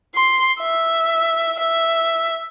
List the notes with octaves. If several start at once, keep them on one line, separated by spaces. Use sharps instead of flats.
C6
E5
E5